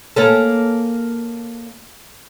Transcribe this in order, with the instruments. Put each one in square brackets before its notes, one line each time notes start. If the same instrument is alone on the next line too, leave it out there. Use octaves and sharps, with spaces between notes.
[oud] A#3 C#4 A4